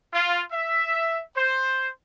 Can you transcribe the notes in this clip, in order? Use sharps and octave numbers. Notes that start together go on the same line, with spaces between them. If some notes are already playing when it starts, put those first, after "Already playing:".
F4
E5
C5